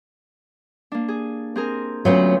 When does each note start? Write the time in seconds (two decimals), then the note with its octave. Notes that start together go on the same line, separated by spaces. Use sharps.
0.92 A#3 D4
1.08 G#4
1.56 C4 G#4 A#4
2.05 D2 F#3 B3 C#4 F4 G6